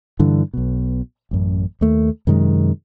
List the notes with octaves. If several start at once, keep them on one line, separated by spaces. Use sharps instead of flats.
G2 D3 E3
B1 B2
A1 F#2
D#2 A3
F#2 C3 D#3 G#3